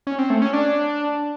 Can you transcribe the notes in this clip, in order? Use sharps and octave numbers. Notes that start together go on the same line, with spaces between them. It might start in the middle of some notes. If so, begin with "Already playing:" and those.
C#4
C4
A3
C#4
D4